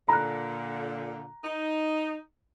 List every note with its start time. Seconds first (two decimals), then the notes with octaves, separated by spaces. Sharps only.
0.08 A#2 D3 A#5 F#6
1.43 D#4